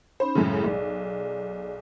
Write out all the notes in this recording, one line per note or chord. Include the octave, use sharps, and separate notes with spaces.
C#4 D#4 C5 B5
F#2 A2 C#3 G#3 E4 G#4
B1 G#4 D5